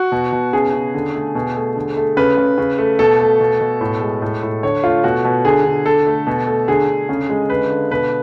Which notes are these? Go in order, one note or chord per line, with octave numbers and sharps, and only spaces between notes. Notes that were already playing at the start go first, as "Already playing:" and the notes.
Already playing: F#4
B2
B2
C#3 G#4
C#3
D3
A3
B2
A3
D3
A3
C#3 B4
C#3
C#3
A3
B2 A4
A3
B2
B2
A2
G#3
A2
A2
D3 C#5
A3 F4
B2 F#4
B2
D3 G#4
D3
D3 A4
A3
B2
A3
D3 G#4
D3
C#3
G#3
D3 B4
D3
B2 B4